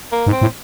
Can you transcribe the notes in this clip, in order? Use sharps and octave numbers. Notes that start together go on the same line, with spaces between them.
A#3
G#2
C4
A2